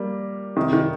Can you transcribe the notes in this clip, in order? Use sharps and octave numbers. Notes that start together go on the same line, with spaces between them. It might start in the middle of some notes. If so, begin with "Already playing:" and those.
Already playing: G3 A#3
C3 D#3
C3 D#3